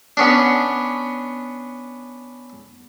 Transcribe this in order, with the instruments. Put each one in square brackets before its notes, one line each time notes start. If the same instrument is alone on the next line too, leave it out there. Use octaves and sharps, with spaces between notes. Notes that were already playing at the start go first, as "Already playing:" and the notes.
[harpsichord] B3 C#4 D4